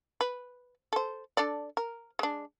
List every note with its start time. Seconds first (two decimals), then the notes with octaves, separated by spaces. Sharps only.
0.21 B4
0.93 A4 C5
1.37 D4 A4 D5
1.77 A#4
2.19 G#3 D4